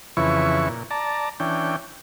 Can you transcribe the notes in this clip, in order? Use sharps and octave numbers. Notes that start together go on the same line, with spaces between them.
F2 C#3 E3 E4 B4 C#6
A#2
D5 A5 A#5
E3 C#4 D4 G5